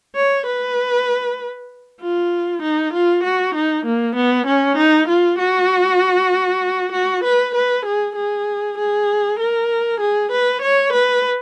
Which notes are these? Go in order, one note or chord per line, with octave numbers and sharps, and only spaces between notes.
C#5
B4
F4
D#4
F4
F#4
D#4
A#3
B3
C#4
D#4
F4
F#4
F#4
B4
B4
G#4
G#4
G#4
A#4
G#4
B4
C#5
B4